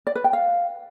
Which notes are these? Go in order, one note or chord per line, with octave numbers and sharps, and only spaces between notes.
D5
B4
G5
F5